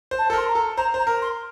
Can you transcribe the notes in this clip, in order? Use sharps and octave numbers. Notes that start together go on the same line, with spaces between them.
C5
A5
A4
A#4 C6
A#5
A4
C5 A#5
C5
A#5
A#4
C6